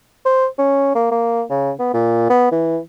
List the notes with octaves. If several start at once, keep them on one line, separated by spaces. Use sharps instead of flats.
C5
C#4
A#3
A#3
C#3
B3
A#2
B3
E3